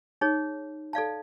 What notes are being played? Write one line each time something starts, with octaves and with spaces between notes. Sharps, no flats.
D#4 G#4 C#5
A4 D5 F5 A5